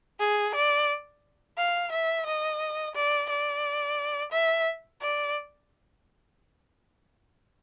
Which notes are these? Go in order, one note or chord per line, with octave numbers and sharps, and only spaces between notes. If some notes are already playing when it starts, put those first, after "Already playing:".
G#4
D5
F5
E5
D#5
D5
D5
E5
D5